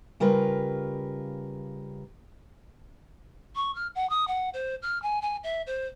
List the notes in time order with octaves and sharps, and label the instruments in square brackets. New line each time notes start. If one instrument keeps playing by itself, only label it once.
[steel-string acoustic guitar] C#3 G3 F4 A#4 B4
[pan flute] C#6
F6
F#5
D#6
F#5
C5
F6
G#5
G#5
E5
C5